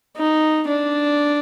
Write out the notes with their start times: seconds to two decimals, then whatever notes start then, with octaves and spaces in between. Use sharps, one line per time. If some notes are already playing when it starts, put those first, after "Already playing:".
0.17 D#4
0.69 D4